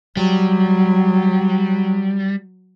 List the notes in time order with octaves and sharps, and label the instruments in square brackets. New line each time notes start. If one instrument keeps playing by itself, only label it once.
[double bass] F#3 [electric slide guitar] G3